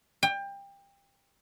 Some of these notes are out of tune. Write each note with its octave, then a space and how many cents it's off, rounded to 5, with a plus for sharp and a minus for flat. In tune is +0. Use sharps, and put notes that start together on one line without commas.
G5 +25